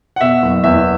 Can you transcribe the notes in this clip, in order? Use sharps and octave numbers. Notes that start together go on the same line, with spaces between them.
F#5
B2 E5
F#1
E2 E5